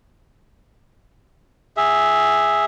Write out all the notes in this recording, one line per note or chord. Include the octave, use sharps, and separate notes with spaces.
G#4 E5